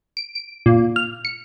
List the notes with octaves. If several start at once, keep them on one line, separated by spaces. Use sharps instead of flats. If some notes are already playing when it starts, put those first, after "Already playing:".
D7
D7
A#2
F6
C#7